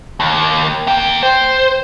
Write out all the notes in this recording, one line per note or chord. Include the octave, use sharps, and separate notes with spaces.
D#2
A#3 G5
C5